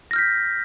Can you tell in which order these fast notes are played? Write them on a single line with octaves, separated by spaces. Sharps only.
A#6 F6 G6 B6